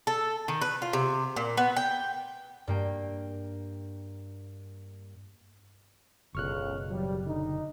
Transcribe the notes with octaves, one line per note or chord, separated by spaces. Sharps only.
A4
D#3
B4
F4
C3
A#2
B3
G5
G2 A#3 G5
F#1 C#2 B2 D3 C#6 F6 F#6
G#1 F#3 G3
D3 D#4